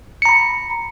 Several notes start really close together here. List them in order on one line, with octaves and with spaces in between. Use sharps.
C#7 A#5 B5